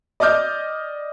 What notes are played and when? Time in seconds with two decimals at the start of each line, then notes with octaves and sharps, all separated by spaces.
0.20 D5 D#5 D6 F6 G6